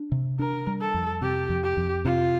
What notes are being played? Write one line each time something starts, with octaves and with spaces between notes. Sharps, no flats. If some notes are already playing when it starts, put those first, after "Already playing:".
Already playing: D4
C3
D4 A#4
G3
A4
F2
C3 G4
F2
G4
F2
C3 F4